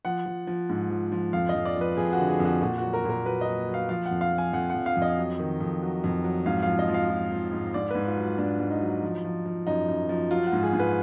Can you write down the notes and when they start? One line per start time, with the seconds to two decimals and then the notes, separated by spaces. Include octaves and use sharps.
0.05 F3 F#5
0.26 F3
0.47 F3
0.70 G#2
0.90 F3
1.12 F3
1.33 F2 F5
1.49 D#5
1.54 F2
1.65 D5
1.76 F3
1.81 B4
1.97 F2 G#4
2.13 F#4
2.19 D3
2.29 G#4
2.40 F2
2.45 F#4
2.62 A#2 F#4
2.78 F#3 F#4
2.93 A#4
3.04 A#2
3.09 A#4
3.25 F#3 B4
3.41 D#5
3.47 F#3
3.68 F#3
3.74 F5
3.89 F3 F5
4.05 F#5
4.11 F2
4.21 F5
4.33 F3
4.38 G#5
4.53 F2 F#5
4.70 F2 F#5
4.86 F5
4.97 F2
5.02 D#5
5.18 F#3
5.39 D#3
5.60 F2
5.82 F#3
6.04 F2
6.24 F#3
6.46 G#2 F5
6.62 F5
6.67 F3
6.79 D#5
6.89 F3
6.94 F5
7.10 F3
7.32 F3
7.53 G#2
7.74 G#2 D5
7.91 G#2 B4
8.07 F4
8.17 F#3
8.23 F4
8.38 G#2 D4
8.60 G#2
8.71 D#4
8.82 F#3
9.03 F3
9.25 F3
9.46 F3
9.67 F#2 D#4
9.88 F#2
10.09 F3
10.31 F#3 F4
10.47 F#4
10.53 G#2
10.63 G#4
10.73 G#2
10.80 B4